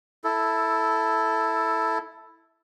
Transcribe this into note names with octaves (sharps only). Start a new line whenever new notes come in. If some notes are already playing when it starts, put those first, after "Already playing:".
E4 A4